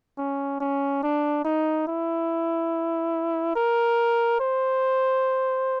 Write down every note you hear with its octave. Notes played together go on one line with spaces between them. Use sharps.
C#4
C#4
D4
D#4
E4
A#4
C5